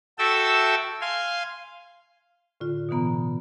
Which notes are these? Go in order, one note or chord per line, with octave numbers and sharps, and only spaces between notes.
F#4 A4 E5 G5 A5 E6
F5 G#5 C6
A2 D3 F4
B2 D3 E3 B3 A#5